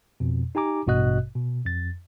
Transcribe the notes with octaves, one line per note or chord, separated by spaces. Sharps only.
F2 B2
D#4 G4 G#5 A#5 D6
A1 G2 B2 F#4 D#5 F#6
B2
F2 A6